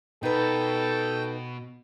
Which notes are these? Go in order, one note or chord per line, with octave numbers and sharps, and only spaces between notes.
B2 D#4 A4 B4 G5